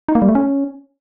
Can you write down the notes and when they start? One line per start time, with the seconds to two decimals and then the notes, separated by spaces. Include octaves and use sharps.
0.09 D#4
0.15 A#3
0.22 G3
0.29 A3
0.35 C#4